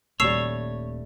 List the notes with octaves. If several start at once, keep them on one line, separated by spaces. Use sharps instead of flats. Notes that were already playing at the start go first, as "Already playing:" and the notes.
D#1 G3 A3 C#5 E6 C7 E7